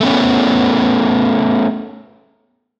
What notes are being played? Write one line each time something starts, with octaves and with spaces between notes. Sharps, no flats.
A3 B3 C#4